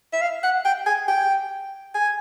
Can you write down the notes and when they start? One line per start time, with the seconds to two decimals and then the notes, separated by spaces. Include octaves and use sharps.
0.13 E5
0.21 F5
0.43 F#5
0.65 G5
0.86 G#5
1.08 G5
1.95 G#5